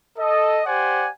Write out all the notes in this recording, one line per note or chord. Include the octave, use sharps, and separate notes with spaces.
A4 D#5
G4 C5 D5 F#5 G#5